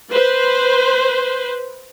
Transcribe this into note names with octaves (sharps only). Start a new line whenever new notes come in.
B4 C5